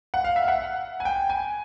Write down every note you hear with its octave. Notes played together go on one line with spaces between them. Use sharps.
F#5
F5
E5
F5
F#5
G#5
G5
G#5